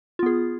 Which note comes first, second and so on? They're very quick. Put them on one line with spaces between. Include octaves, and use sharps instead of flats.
F4 B3 G#4